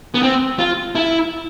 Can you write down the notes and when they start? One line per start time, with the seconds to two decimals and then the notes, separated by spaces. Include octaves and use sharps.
0.14 B3
0.23 C4
0.59 F4
0.95 E4